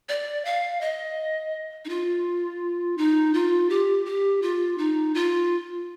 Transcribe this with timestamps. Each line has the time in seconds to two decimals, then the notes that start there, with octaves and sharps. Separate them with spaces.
0.09 D5
0.45 F5
0.81 D#5
1.85 D#4
1.89 F4
2.98 D#4
3.34 F4
3.70 G4
4.05 G4
4.42 F4
4.78 D#4
5.14 F4